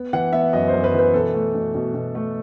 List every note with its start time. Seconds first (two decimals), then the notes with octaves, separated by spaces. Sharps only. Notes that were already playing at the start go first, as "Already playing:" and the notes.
Already playing: B3
0.13 E3 F#5
0.33 B3 E5
0.53 F#2 D#5
0.68 C5
0.74 F#2
0.84 B4
0.94 E3 B4
1.14 B2 A4
1.34 A3
1.55 B2
1.75 B2
1.94 B2
2.15 A3